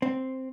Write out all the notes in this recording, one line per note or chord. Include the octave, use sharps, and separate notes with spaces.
C4